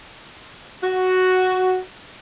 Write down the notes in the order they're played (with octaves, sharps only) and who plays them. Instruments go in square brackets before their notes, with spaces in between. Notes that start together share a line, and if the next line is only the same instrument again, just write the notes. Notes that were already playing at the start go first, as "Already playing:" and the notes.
[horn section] F#4